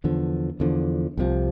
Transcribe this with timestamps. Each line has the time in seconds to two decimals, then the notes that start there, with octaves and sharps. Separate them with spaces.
0.04 E2 D3 F3
0.60 E2 D3 F3
1.17 C2 C3 F3